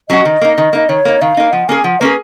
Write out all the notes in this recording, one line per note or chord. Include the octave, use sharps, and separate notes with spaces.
F#3 C#4 F#4 D#5
D#3
A#3 D#4
D#3
A#3 D#4
D#3 C#5
A#3 D#4
D#3 F5
A#3 D#4
F3 F#5
A#3 C#4 G#4 G#5
F3 F#5
A#3 C#4 G#4 B4